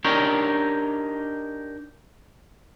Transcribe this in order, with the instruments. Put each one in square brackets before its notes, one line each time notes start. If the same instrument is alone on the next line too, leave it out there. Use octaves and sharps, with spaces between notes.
[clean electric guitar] D4 D#4 G4 A#4 C#5